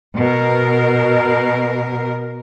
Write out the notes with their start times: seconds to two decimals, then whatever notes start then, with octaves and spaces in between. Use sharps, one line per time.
0.16 B2 A#4